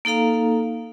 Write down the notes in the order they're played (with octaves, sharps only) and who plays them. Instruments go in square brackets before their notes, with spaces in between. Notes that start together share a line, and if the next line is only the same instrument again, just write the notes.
[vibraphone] A#3 D#4 A4 F5 A#5